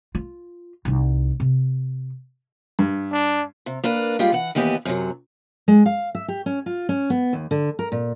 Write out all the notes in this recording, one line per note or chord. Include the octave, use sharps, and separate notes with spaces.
F4
C2 D#4
C3
G2
D4
C3
A#3 D4 A#4 B4
G3 G#3 F4 G4
E3 F#5
D#2 E3 B3 G4 D#5
F#2 C3 F#3
G#3
F5
E5
G4
C#4
F4
C#4
B3
D#2
D3
A#4
A#2